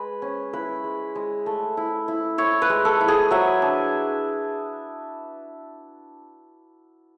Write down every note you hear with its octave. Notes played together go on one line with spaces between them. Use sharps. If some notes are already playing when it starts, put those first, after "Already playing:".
Already playing: G#3 B4
C#4
E4 B4
G#3
G#3
A3
E4
E4
E4 C#5
B4
G#3
A4
E4
G#4
F#3 E5
D4